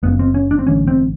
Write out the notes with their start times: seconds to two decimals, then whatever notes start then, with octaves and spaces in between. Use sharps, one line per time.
0.03 F#1 F#2 C#3 B3
0.19 C4
0.34 C#4
0.51 D4
0.59 C4
0.67 A1 G2 D3 C#4
0.87 C4